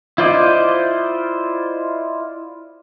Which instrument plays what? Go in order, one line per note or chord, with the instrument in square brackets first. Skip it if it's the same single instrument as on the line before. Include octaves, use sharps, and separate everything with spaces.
[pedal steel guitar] E4 F4 C5 D5 D#5